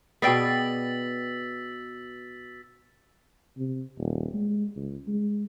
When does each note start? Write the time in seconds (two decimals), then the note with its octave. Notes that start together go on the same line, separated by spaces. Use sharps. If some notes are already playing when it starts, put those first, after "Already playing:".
0.22 B2 B3 G#4 D5 G5 E6 A6 B6
3.58 C3
3.98 D#1
4.34 G#3
4.76 C#2
5.08 G#3